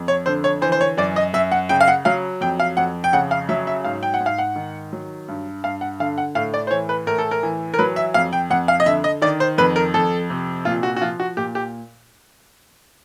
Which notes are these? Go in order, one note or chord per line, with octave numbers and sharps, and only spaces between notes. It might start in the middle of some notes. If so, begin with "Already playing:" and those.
Already playing: F2
C#5
D3 C5
C#5
E3 C5
C5
C#5
F#2 D5
D#5
F#2 E5
F#5
C#3 G5
F5
F#5
F#3 F5
F2 G5
F5
F2 F#5
G5
C#3 F#5
F5
F#3 E5
E5
G#2 F5
G5
F#5
G#2
F5
F#5
D#3
F#3
G2
G2 F5
F#5
D3 F5
F#5
A2 F5
D5
C5
E3 C#5
B4
A2 A#4
A4
A#4
E3
A#4
F#3 B4
E5
F2 F5
G5
F2 F#5
F5
D#5
D3 E5
D#5
D#3 D5
C5
F2 B4
A#4
F2 A4
C3
A#2 F4
F#4
F#4
F3 F4
F#4
A#2 G4
G4